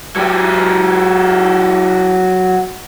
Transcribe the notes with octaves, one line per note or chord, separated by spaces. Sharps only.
F#3 G4